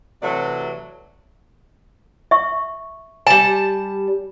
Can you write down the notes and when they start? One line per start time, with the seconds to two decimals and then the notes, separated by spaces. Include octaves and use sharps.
0.23 C3 E3 F#3 A3 D5
2.31 E5 C#6
3.27 G3 G#5 A5